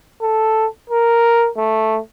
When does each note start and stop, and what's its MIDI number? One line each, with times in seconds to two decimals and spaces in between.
0.22 0.66 69
0.90 1.49 70
1.57 1.99 57